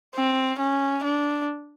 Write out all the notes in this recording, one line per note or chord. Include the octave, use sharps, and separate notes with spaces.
C4
C#4
D4